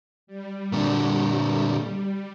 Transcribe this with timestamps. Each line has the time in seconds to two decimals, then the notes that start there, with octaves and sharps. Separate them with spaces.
0.27 G3
0.72 A#2 D3